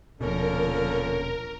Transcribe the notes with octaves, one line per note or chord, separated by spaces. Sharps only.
D#1 B2 D3 F3 A#3 C#4 A#4